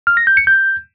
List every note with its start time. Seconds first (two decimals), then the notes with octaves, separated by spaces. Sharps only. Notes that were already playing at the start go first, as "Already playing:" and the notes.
0.07 F6
0.17 A#6
0.27 G6
0.37 C#7
0.47 G6